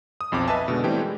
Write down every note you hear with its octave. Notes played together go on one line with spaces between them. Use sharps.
D#6
B1 F2 C4 D6
B4 D#5 E5 G#5 A5
B2 D3 G#3
E3 G3 A3 C4 G4
G#3